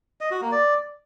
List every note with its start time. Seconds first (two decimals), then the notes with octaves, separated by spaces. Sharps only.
0.21 D#5
0.31 F#4
0.41 A#3
0.52 D5